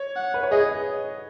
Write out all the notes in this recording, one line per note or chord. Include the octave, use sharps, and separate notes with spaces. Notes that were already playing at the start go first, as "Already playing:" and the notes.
Already playing: C#5
F#5
B4
C#5
G#4 D#5